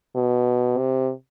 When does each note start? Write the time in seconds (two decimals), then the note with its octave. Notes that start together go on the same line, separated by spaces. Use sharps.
0.15 B2
0.78 C3